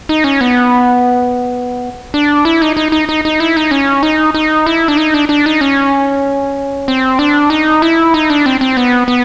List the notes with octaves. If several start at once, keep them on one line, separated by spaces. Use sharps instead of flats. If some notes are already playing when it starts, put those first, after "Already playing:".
D#4
C#4
B3
D4
E4
D#4
D#4
D#4
D#4
D#4
E4
D#4
C#4
D#4
D#4
E4
D4
D#4
D4
D4
D#4
C#4
C4
D4
D#4
E4
D#4
D4
C4
C4
B3
B3